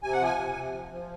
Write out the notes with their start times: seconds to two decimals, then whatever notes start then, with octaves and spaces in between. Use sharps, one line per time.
0.03 C3 G#5
0.13 F#5
0.20 F3 G#5
0.38 C3
0.55 C3
0.74 F3
0.92 F3